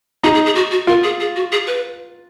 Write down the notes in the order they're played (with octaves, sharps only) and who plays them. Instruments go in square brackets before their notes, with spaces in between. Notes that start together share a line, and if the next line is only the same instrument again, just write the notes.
[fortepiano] D#4 [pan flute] G#4
[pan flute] G#4
G#4
F#4
F#4
[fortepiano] F4 [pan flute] A#4
[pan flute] G#4
G#4
F#4
G#4
B4